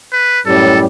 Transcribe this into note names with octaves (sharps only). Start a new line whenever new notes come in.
B4
F#2 A2 G3 A4